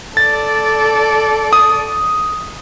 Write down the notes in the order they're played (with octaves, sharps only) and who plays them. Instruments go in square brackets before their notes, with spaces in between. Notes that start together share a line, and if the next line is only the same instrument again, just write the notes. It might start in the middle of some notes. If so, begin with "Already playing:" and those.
[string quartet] A4 D5 [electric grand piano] A6
[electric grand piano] D#6